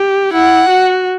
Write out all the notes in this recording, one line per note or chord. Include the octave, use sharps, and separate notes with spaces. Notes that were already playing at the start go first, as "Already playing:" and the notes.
Already playing: G4
E4 F#5
F#4